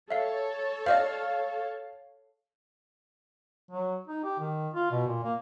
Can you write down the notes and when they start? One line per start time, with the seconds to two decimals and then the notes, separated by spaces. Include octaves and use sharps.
0.11 A4 C#5 E5 F5
0.86 C5 D5 D#5 F5
3.71 F#3
4.08 D#4
4.24 G4
4.39 D#3
4.74 F4
4.91 B2
5.07 A#2
5.23 A#3